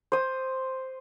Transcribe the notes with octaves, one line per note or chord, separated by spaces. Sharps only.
C5 D#6